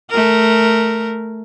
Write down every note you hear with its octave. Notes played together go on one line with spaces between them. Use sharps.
A3 A#4